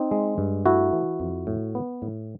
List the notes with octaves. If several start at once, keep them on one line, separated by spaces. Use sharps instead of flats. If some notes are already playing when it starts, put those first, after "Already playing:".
Already playing: C4 D#4
G#3
G2
A3 E4 F#4
E3
F2
A2
B3
A2